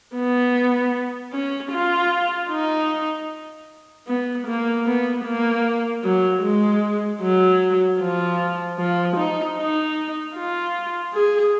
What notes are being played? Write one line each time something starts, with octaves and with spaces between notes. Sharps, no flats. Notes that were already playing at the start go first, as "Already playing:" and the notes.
B3
C#4
F4
D#4
B3
A#3
B3
A#3
F#3
G#3
F#3
F3
F3
D#4
D#4
F4
G#4